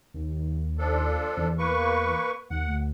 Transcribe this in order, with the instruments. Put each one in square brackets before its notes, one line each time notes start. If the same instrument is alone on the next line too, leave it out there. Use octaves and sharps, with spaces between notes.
[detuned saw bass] D#2
[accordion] F3 D4 A4
[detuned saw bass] E2
[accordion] A#3 B4 C#6
[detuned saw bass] D#2 [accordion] F#5
[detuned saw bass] D2